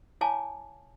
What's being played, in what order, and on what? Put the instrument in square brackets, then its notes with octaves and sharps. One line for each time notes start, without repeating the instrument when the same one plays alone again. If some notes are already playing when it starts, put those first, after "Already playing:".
[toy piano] E4 C#5 F5 G#5 A5 D6